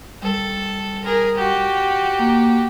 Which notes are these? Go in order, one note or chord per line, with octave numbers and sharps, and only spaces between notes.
G3 A4
G#4 A#4
F#4 G4
A#3